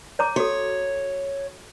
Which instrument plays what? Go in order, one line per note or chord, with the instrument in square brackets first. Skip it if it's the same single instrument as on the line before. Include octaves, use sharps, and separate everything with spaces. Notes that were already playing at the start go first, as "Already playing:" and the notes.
[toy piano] C#5 A#5 D6
[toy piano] F#4 A4 [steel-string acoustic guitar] C#5